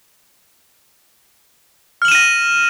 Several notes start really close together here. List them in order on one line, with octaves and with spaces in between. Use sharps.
F6 F#7 E7 D#7 A#6